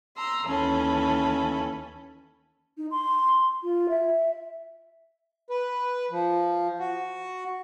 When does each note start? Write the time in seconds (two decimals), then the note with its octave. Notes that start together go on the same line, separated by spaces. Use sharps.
0.17 A#5 C6 E6
0.46 D#2 E3 C#4 A4 B5
2.78 D#4
2.91 C6
3.63 F4
3.89 E5
5.50 B4
6.11 F3
6.80 F#4